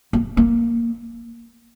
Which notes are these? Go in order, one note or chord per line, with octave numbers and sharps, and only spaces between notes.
A#3
A#3